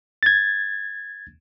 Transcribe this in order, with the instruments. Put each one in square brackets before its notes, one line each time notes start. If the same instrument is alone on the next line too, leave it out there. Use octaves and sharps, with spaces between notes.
[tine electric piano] G#6 A6